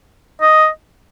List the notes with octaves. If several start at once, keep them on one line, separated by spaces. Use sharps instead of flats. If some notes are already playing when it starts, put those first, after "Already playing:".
D#5